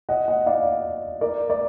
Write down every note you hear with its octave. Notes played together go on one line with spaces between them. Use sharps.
D#5 F#5
D#5 F#5
D5 F5
A#4 D5
A#4 D5